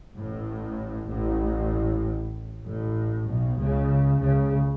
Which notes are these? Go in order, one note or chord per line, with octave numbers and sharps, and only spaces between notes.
A1 A2
A1 A2
A1 A2
B1 B2
C#2 C#3
C#2 C#3